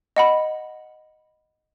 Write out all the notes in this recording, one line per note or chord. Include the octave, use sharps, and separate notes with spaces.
D#5 F#5 B5